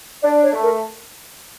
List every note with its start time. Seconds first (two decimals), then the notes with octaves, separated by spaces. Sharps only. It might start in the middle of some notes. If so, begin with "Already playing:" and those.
0.23 D4 D5
0.43 C#5
0.53 A3
0.63 A#4